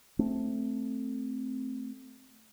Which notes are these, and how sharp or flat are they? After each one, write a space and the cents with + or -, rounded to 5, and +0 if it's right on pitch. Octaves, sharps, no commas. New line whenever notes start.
A3 +0 C4 +0